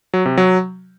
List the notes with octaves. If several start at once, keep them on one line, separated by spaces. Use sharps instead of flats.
F#3
C3
F#3